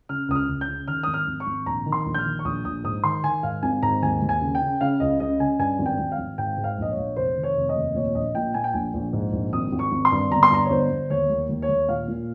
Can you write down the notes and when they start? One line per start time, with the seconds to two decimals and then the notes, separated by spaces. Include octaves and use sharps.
0.09 C#3 F6
0.28 C#2 D#6
0.35 F6
0.48 C#2
0.61 G6
0.68 C#3
0.88 D#3 F6
1.03 G#1 D#6
1.14 F6
1.27 G#1
1.40 C#6
1.47 G#1
1.66 A#1 A#5
1.86 D#3
1.92 C6
2.06 A#1
2.14 G6
2.18 F6
2.25 D#3
2.39 C#6
2.45 A#1 D#6
2.65 A#1 D#6
2.84 G#2 D#6
3.04 D#3 C6
3.24 D#3 G#5
3.43 G#2 F5
3.63 G#1 G#5
3.83 G#2 A#5
4.02 D#2 G#5
4.22 D#2
4.29 G#5
4.41 C#3
4.55 G5
4.61 C#3
4.81 C#3 F5
5.00 C#2 D#5
5.20 C#3 D#5
5.40 C#3 G#5
5.59 G2 G#5
5.79 G#1
5.86 G5
5.99 G#1
6.12 F5
6.18 G#1
6.38 G#2 G5
6.58 G#2
6.64 F5
6.78 A#1 D#5
6.91 C#5
6.97 A#1
7.16 F1 C5
7.37 D#3
7.43 C#5
7.56 F1
7.69 D#5
7.76 D#2
7.95 A#2 C#5
8.15 A#1 D#5
8.35 A#2 G5
8.54 A#2 G#5
8.64 G5
8.73 A#1 G#5
8.94 A#1
9.13 G#2
9.33 A#1
9.53 G#1 D#6
9.72 G#1
9.79 C#6
9.92 G#1
10.05 C6
10.12 G2
10.31 G1 A#5
10.43 C6
10.51 G2 A#5
10.65 C#5
10.71 G1 C5
10.91 G1
11.10 D#2 C#5
11.30 D#2
11.49 D#2
11.62 C#5
11.69 D#2
11.88 A#2 F5
12.08 A#2